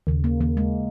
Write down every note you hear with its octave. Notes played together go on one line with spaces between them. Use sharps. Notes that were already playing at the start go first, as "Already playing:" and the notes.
D#2 C#3
A#3
D#2 A#3
G#3